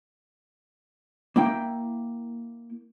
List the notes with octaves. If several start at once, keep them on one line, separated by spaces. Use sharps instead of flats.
A#3 E4 G5